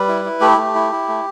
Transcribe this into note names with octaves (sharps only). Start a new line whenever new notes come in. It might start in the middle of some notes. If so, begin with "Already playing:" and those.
Already playing: G3 B4
E4
E4
A3 G4
A3
E4
E4
A3